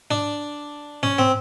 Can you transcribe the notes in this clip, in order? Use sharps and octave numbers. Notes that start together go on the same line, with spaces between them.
D4
C#4
C4